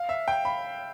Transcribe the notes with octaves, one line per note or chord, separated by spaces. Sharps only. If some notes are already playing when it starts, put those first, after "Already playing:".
Already playing: F5
E5
G5
B5